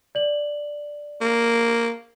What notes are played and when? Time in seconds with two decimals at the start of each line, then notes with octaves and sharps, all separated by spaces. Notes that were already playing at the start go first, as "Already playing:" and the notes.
0.15 D5 F#7
1.21 A#3